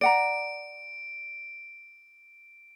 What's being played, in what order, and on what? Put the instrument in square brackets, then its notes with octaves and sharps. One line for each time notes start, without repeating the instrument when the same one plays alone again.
[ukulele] D5 F#5 A#5 [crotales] D7